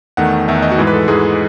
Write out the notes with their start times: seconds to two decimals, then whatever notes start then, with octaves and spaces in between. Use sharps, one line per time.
0.17 E2 D#3 A3 F#5
0.48 E2 D#3 A3 E5
0.62 D#5
0.71 F#4
0.78 G#2 E3 G#3 G#4
0.87 B4
0.93 A4
1.08 G#2 E3 G#3 G#4